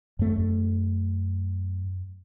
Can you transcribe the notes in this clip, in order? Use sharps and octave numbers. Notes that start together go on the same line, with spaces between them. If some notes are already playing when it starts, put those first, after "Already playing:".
F#2 A3